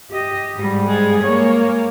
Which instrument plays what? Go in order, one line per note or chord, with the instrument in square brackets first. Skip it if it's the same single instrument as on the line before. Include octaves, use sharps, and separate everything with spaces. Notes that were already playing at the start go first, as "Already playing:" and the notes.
[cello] G4 D#5
G#2 G3
[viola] G#3 G#4
[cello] G#3 C#5 [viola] A#3